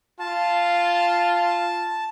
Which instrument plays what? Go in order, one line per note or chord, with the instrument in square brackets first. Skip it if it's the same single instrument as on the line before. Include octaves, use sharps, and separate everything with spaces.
[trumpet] F4 [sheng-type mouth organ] A5